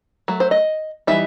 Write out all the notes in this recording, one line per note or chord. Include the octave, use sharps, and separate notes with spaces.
F#3 A3
C5
D#5
E3 G3 C4 D#4 E5